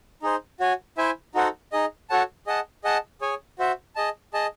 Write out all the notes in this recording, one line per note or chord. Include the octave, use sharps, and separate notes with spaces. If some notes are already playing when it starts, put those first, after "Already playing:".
D#4 G#4 C5
F#4 C#5 G#5
E4 C5 E5 G#5
D#4 F#4 A4 C5 F#5
D#4 G#4 D#5
F#4 A4 C#5 F#5 A5
G#4 D#5 F#5 A5
G#4 D#5 F#5 A5
G#4 C#5 G#5
F#4 C5 E5
G#4 D#5 A5
G#4 D#5 A5